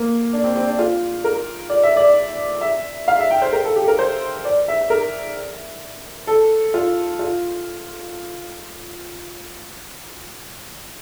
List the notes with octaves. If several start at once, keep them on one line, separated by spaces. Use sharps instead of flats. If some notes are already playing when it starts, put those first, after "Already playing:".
Already playing: A#3
D4
C4
C4
D4
F4
A#4
D5
E5
D5
E5
F5
E5
G5
C5
A#4
A4
G4
A#4
C5
D5
E5
A#4
A4
F4
F4